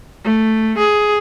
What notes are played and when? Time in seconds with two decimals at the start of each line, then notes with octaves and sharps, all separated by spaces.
0.24 A3
0.78 G#4